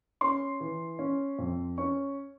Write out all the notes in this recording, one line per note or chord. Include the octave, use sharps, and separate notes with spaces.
C#4 C6
E3
C#4
F2
C#4 C#6